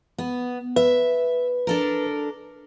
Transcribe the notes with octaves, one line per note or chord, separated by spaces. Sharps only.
B3
B4 E5
D4 A4 A#4